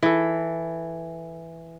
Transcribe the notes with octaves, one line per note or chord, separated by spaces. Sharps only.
E3 A4